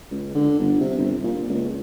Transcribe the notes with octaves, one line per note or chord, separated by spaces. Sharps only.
C#2
D3
G1
C3
G1
A#2
C#2